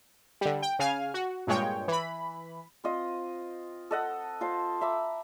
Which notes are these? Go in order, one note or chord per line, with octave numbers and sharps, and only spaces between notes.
D3 G3
G5
C#3 F5 G#5 F6
F#4
G2 A#2 G#3 C#5 G5
E3 B5
C4 F4 D#5
A4 D#5 F#5
F4 C5 A5
E5 A#5 B5 D6